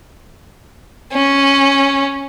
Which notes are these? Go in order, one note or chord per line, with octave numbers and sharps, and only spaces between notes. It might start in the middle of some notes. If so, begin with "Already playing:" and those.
C#4